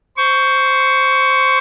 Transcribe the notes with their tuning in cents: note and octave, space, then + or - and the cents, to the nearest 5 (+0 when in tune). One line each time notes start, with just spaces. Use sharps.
C5 +0 C#6 +15